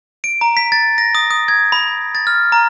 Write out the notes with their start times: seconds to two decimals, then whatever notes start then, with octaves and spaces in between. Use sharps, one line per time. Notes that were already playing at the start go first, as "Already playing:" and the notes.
0.24 D7
0.41 A#5
0.57 B6
0.72 A6
0.98 A#6
1.15 D#6
1.30 D#6
1.48 G#6
1.72 B5
2.15 A6
2.27 F6
2.52 A#5